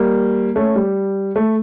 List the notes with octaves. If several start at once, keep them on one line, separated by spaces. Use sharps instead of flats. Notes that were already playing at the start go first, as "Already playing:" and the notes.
Already playing: G3 A#3
A3 C#4
G3
A3